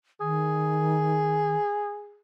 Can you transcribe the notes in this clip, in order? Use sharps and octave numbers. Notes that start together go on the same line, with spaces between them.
D#3 G#4